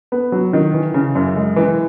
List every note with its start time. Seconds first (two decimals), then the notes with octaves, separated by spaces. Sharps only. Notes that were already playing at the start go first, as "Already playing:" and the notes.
0.12 B3
0.32 F#3
0.53 D#3
0.74 E3
0.94 C#3
1.15 F#2
1.36 G#3
1.56 E3